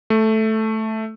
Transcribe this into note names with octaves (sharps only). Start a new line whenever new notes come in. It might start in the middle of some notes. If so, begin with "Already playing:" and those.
A3